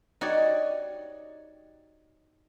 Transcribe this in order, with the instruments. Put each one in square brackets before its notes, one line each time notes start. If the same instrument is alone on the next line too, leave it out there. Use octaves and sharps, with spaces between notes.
[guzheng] D#4 F#4 G4 C#5 D5